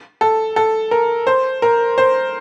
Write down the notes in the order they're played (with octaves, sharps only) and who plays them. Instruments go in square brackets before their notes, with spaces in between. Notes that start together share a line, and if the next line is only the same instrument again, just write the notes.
[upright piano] A4
A4
A#4
C5
A#4
C5